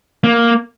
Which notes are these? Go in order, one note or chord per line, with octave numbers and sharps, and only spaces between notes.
A#3